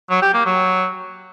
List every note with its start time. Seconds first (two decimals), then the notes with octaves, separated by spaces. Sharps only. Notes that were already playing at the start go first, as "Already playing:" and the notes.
0.11 F#3
0.22 G4
0.34 A#3
0.46 F#3